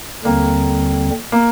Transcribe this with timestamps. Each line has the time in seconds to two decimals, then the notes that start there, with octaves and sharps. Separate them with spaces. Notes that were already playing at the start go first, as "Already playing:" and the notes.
0.24 D#2 D3 G3 A#3 C4
1.32 A#3